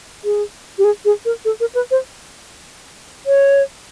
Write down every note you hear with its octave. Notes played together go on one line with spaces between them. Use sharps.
G#4
G4
G#4
G#4
A#4
A4
A#4
B4
C5
C#5